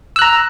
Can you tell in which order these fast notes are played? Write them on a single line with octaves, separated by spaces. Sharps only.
E6 F#6 A#5